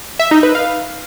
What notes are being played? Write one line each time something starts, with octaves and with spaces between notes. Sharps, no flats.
E5
D#4
B4
F5